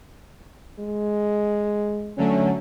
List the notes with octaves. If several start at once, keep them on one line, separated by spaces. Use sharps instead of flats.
G#3
D3 F#3 A3 C#4